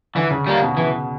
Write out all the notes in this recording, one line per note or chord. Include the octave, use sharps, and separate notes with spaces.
D3 E3
C#3
C#3 G3 A#3
B2
C#3 E3